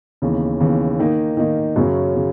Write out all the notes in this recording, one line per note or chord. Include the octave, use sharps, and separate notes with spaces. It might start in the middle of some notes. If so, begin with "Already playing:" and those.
D#2 C#3 E3 B3
D#2 C#3 E3 B3
D#3 A#3 D#4
D#3 A#3 D#4
F#2 C#3 F#3
C#3